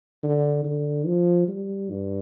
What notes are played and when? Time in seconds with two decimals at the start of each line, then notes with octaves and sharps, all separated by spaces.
0.23 D3
0.64 D3
1.06 F3
1.48 G3
1.90 G2